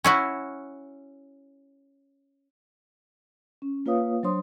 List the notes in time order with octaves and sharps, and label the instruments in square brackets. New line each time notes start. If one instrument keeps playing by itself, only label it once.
[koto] C#4 E4 F#4
[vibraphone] C#4
A#3 F4 B4 C#5 F5 D#6
F#3 D4 C5 C#5 C6 D#6